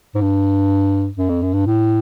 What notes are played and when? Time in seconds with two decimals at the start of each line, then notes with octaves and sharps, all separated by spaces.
0.15 G#2
0.21 G2
1.18 F#2
1.29 F2
1.42 F#2
1.54 G2
1.66 A2